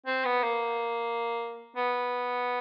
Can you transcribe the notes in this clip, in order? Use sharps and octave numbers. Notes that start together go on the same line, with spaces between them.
C4
B3
A#3
B3